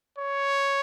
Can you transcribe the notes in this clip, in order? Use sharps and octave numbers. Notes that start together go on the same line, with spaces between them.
C#5